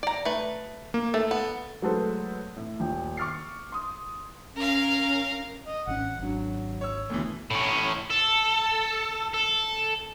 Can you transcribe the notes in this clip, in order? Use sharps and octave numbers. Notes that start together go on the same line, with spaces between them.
D5 A#5
A3 B4
A#3
A3 A4
B3
F#3 G#3 A3 A4 B4 C5
A2
D#1 G5
C#6 D6 F6 A6 C7
C6 D#6
C#4 A#4 F5
D#5
G#1 C3 C#4 F#5
G#1 F#3 D4
C#5 E6
D2 B2 E3
A2 C#4
A4
A4